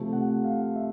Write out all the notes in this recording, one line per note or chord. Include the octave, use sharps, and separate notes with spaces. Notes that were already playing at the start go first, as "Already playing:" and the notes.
Already playing: C3 F3 A3
F#5
F5
E5